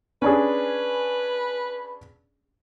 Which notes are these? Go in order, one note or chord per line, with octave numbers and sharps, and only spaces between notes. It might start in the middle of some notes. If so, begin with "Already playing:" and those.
C#4 D4 G#4 B4